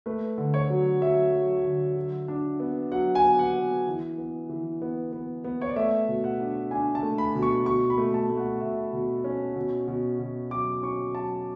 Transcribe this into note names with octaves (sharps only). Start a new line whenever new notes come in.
A3 B4
D3
C#5
F#3
F#3 E5
F#3
D3
F#3
D4
B3
F#3 F#5
G#5
B3
F#5
B3
E3
B3
E3
B3
B3
B3
C#5
D5
A3 E5
B2
F#5
D4
D4 G#5
A5
A3
B5
B2
C#6
B2 C#6
B5
A3
A5
A3
F#5
B2 E5
B2
C#4
B2
B2
B2
F#3 D6
C#4 C#6
F#3 A5